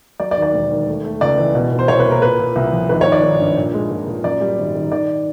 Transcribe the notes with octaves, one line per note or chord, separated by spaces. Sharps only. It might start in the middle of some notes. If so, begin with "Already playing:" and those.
F#3 D5
D5
D#2
D5
E1
D#2
A3
A3
C#2 D5
E3
B2
B2
C5
C2 C#5
B4
A#3
A#4
A#2 B4
A#2
C2
F3
G#1 B4
C#5
D#3
D5
G#1
G2
A#2
G#3
A#2
A#2
F#2 D5
G3
G#1
D#3
D#3 D5